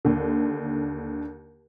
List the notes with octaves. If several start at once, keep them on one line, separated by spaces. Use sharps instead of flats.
D#2 D3